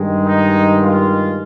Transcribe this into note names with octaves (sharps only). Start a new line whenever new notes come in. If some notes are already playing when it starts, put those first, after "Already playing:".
Already playing: G2 D#3 G#3
D#4
F4